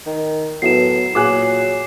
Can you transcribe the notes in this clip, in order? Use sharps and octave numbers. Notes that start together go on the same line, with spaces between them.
D#3
A2 F#3 B3 E4 C7 E7
A#2 F#3 G#4 D6 F#6 E7
C7